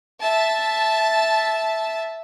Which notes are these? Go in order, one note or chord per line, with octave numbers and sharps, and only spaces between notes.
E5 A5